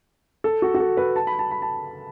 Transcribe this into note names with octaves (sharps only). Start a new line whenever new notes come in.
A4
F#4
F#4
A4
B4
A5
B5
A5
B5
A5